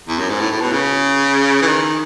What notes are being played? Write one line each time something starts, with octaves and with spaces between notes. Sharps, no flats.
E2
F#2
G#2
A2
A2
B2
C#3
E3
D#3